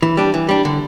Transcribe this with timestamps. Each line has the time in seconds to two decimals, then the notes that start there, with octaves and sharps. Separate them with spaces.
0.02 E3
0.17 G3 D4
0.34 E3
0.49 G3 D4
0.65 D3